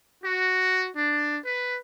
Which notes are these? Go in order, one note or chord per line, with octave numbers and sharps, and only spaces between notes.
F#4
D4
B4